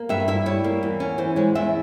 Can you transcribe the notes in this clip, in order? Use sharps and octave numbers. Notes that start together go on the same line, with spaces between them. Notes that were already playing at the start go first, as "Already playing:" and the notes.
Already playing: A#3
G2 E5
E4 E5
G3 C#5
A#3
E2
C#4
E3 C5
G#3 C#5
E2 E5